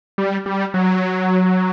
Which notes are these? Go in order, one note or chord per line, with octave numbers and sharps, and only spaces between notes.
G3
G3
F#3